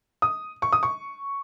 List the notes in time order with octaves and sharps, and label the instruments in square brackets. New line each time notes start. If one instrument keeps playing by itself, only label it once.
[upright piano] D#6
C#6
D#6
C#6